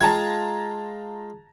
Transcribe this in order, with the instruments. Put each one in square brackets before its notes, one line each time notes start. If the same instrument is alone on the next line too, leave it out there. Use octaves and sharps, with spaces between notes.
[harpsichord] G#3 F4 G5 [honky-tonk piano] A5 A#5 G#6